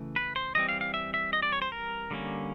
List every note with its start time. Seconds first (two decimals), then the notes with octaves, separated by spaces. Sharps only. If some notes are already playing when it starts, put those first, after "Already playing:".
Already playing: C#3 E3 A3
0.16 B4
0.36 C5
0.55 E3 G3 C4 D#5
0.69 F5
0.81 F5
0.94 E5
1.14 E5
1.33 D#5
1.42 D5
1.52 C#5
1.62 C5
1.72 A#4
2.11 D3 G3 A#3 C#4